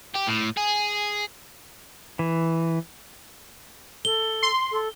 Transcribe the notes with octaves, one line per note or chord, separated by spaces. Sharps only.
G4
A2
G#4
E3
A4 G7
C6
A4